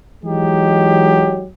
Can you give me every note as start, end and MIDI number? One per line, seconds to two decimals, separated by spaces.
0.24 1.47 52
0.24 1.47 54
0.24 1.47 56
0.24 1.47 63
0.24 1.47 67